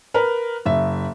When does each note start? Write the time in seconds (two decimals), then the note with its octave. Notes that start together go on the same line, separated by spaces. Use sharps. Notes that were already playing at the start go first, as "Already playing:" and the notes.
0.14 A#4 B4
0.65 F#1 E5